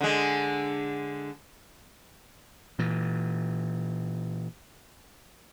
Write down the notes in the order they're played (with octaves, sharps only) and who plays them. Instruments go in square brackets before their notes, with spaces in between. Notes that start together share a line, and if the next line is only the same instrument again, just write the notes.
[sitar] D3 G#3
[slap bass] A#2 E3